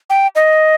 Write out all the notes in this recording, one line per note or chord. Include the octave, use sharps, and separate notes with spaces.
G5
D#5